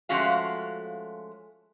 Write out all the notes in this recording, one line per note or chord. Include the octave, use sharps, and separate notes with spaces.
F3 G#3 A3 C#4 F#4 F5